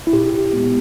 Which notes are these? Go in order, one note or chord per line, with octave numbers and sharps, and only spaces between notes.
E4
A#2 G4
G#3 B3